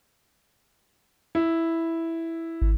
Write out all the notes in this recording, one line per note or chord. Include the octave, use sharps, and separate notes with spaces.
E4
G#1